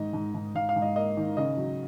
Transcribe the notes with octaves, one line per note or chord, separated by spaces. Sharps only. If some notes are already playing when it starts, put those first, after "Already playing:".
Already playing: G#2 D#3 D#5
G#2
G#2
G#2 F5
F5
G#2
D#5
A#3 D#5
D#3
C#3 D#5
F#3